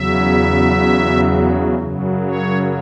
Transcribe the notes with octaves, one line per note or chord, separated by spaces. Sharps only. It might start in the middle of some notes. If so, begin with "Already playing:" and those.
Already playing: E2 C#3 F#3 E5
F#2 C#3 F#3
C#5